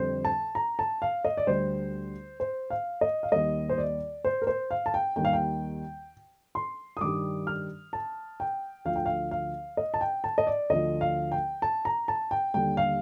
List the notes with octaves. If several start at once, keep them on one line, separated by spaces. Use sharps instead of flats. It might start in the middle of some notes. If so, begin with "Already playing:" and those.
Already playing: F2 D3 G3 C5
A5
A#5
A5
F5
D#5
D5
D2 D3 G3 C5
C5
F5
D#5
F5
D#2 D#3 G3 D#5
C5
D5
C5
A#4
C5
F5
A5
G5
D#2 D#3 G3 G5
F5
G5
C6
D#6
G2 D#3 G3 D6
F6
A5
G5
D2 D3 F3 F5
G5
F5
F5
D#5
A5
G5
A5
D#5
D5
D2 D3 F3 D#5
F5
G5
A5
A#5
A5
G5
D#2 D3 G3 G5
F5